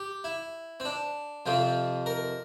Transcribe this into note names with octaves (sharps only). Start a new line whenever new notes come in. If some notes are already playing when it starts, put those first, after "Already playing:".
Already playing: G4
E4
C4
D4
F2 C3 F3 C4
A#4